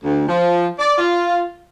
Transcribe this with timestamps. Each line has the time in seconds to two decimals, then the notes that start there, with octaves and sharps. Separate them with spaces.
0.04 D2
0.29 F3
0.78 D5
0.98 F4